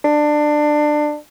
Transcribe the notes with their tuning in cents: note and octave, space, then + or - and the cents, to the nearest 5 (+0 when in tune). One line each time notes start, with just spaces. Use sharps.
D4 +20